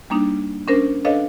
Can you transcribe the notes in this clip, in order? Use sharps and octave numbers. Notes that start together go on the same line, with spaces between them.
G3 A#3 D4 D#4
C#4 D4 A#4 C5
D4 A4 B4 C#5 D#5 F5